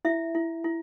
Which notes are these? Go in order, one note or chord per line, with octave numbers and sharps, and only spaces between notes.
E4 E5
E4
E4